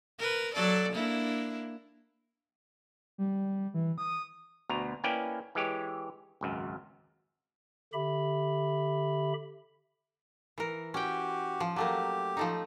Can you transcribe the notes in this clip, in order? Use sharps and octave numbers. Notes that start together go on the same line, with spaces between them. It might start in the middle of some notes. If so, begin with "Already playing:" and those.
A#4 B4
F#3 A4 D5
A#3 D4 E4
G3
E3
D#6
D2 B2 A#5
A#3 C#4 E4 B4 D5 G5
E3 G#3 G4 C#5
G#1 C#2 F#2
D3 G4 E5 B5
E3 A#4
C#4 F#4 G4 G5
F3
F#3 A3 A#3 G4
F3 A3 D#4